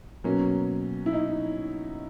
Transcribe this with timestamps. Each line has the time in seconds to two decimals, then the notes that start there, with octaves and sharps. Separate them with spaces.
0.24 B2 F#3 A#3 C#4
1.06 E4
1.13 D#4